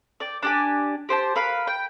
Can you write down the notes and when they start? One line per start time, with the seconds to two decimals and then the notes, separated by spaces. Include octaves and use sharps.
0.20 D5 G5
0.43 D4 G4 G#5
1.09 G4 C5 F#5 A5
1.35 A#4 B4 F5 B5
1.67 G5